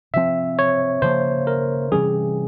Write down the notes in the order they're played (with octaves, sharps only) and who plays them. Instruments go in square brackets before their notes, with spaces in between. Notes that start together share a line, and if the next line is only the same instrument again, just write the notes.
[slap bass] C3 F3 C4 [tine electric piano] E5
[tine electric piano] C#5
[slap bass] C#3 F3 A#3 [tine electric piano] C5
[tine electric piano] A#4
[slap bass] C3 E3 G3 C#4 [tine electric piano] G#4